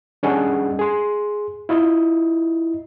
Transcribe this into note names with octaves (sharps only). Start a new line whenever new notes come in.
G3 C#4 D4 G#4 D#5 F#5
G#4 C6
E4 F4 D#5